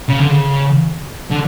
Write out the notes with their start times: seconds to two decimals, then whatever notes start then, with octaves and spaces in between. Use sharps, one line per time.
0.09 C#3
0.19 D3
0.29 C#3
1.30 D3